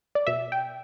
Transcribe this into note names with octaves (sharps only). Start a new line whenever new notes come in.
D5
B2 E5
G5